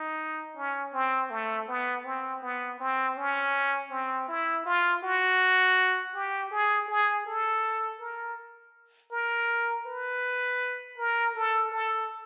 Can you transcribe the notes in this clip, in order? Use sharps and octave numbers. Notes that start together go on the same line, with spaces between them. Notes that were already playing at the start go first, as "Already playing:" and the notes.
Already playing: D#4
C#4
C4
A3
B3
C4
B3
C4
C#4
C4
E4
F4
F#4
G4
G#4
G#4
A4
A#4
A#4
B4
A#4
A4
A4